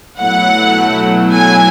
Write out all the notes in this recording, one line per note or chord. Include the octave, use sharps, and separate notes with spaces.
B2 F#3 A3 E4 F#5
G#5